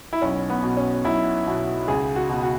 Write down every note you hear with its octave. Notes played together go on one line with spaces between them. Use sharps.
E4
B1 C#4
B3
B2
C#4
B1 E4
B2
C#2 G#4
F#4
B2
F#4